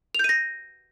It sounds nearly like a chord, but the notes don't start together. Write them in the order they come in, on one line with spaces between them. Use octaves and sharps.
F7 G6 D#7 A#6